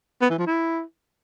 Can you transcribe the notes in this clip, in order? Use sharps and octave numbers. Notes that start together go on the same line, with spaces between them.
B3
E3
F3
E4